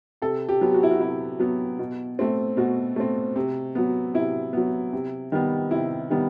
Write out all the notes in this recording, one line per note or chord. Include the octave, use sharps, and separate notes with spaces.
C3 A4
G4
F#3 B3
F#4
E4
F#4
C3 E4
F#3 B3
B2
A3 C4
B2 F#4
A3 C4
C3
F#3 B3
C3 E4
F#3 B3
C3
D#3 G3 B3
C3 E4
D#3 G3 B3